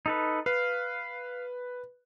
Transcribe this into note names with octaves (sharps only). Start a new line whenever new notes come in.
D#4 A4 B4
B4 F5